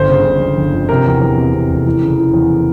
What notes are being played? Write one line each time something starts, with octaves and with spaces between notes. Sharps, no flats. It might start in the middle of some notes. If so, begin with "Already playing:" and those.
Already playing: G1 C5
C#3
G1
G1
G1
F2
C3 A#4
E2
E2
C3
C3
F1
E3
C#3
E3
E2